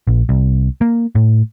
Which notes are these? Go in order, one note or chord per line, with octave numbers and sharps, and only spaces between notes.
A#1
C2
A#3
A2